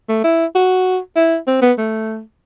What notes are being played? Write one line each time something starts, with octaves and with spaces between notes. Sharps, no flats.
A3
E4
F#4
E4
C4
B3
A3